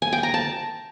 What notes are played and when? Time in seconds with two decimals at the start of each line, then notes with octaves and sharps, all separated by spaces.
0.02 G#5
0.13 G5
0.23 A#5
0.34 A5